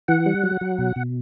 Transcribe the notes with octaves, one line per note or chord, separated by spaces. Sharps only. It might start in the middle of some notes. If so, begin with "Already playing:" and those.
E3 F#5
G3
F#3
F#3
B2
B2